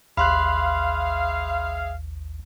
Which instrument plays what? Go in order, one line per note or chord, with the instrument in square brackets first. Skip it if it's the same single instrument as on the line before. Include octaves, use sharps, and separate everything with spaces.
[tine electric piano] A1 D#2 [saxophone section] G#4 E5 F5 [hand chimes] B5 C6 F#6